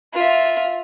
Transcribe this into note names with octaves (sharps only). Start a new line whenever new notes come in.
F4 E5